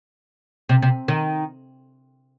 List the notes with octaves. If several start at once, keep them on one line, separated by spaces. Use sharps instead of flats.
C3
C3
D#3